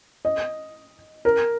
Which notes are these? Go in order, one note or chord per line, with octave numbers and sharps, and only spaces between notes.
D#5
A#4